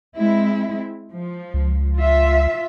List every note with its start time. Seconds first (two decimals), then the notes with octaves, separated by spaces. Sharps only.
0.17 G#3 C4 E4
1.12 F3
1.54 C#2
1.96 F4 E5